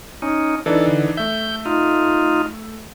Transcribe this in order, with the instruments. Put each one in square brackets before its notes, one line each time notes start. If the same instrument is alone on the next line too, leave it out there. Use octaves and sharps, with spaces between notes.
[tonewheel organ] C#4 D#4
[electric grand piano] E3 D4 D#4 [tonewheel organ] A4
[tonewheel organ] D3
[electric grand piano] A3 E5 [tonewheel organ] G6
[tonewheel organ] D#4 F4